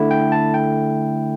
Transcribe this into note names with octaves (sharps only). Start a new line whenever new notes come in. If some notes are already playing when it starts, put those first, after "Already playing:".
Already playing: D3 A3 E4
G5
A5
G5